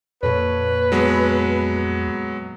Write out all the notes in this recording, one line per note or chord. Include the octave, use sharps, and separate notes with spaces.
F2 A#2 A4 B4 C#5
F#3 G#3 B3 A4